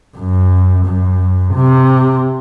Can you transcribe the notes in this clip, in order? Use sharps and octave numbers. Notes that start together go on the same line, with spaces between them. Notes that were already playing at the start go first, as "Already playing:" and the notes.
F#2
F#2
C3